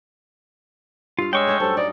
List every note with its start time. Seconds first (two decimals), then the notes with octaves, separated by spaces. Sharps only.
1.19 G2 F4 F5
1.33 G#3 C#5 D5 G5 C#6 E6
1.47 A3 C#4 E5
1.60 G2 F#3 A4 C5
1.77 D#4 D5